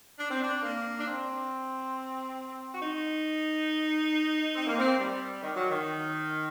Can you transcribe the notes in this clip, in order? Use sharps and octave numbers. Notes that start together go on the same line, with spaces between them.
D4
C4
D4
A#3
D4
C4
F#4
D#4
C4
A#3
C4
G3
D#3
F#3
D#3